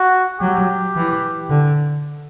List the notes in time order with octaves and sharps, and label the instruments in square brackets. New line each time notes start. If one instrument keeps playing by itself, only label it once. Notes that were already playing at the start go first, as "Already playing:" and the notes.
Already playing: [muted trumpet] F#4
[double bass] F#3 [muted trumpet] G4
[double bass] E3
D3